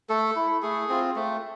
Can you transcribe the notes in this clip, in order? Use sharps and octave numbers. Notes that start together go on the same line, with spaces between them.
A3 A4
E4
A3 G#4
C4 F4
A3